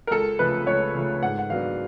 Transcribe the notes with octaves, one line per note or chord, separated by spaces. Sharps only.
A#4
C#2 A4
C#3 F3 A3 B4
C#2 C#5
C#3 F3 A3
G#2 F#5
F#5
D#3 F#3 B3 D4 F5